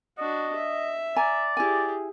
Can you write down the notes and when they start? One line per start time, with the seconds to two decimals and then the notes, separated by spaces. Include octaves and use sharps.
0.18 D4 F#4 D#5
0.56 E5
1.16 D5 G#5 A#5
1.57 E4 G4 G#4 G#5